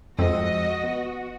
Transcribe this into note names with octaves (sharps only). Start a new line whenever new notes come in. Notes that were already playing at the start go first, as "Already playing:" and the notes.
F2 F3 G#3 F#4 D#5 E6
B3